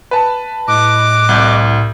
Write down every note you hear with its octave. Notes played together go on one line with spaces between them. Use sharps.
B4 A5
A2 D#5 D6 F#6
C2 G6